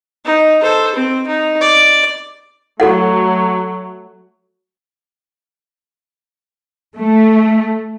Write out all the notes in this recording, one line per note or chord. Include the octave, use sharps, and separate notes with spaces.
D#4
A4 C5
C4
D#4
D5
F#3 A3 F#4 A4 F#5
A3